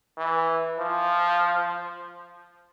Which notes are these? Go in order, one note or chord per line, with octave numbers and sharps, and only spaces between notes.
E3
F3